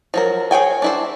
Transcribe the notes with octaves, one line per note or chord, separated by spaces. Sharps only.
F3 F#3 A#4
G#4 C#5 G5 G#5
D4 E4 C5